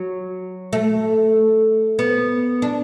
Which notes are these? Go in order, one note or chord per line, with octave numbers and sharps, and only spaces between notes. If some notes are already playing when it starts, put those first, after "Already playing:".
Already playing: F#3
A3
B3
D4